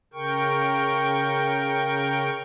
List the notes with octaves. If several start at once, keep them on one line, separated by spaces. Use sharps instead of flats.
C#3 A#4 G5 C#6